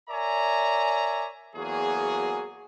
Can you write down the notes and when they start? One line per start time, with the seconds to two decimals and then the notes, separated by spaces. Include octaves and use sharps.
0.10 A#4 C#5 D5 E5 G#5 A#5
1.56 E2 F#3 A#3 F#4 G#4